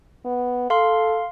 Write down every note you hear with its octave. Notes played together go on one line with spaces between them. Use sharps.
B3
A4 F5 C6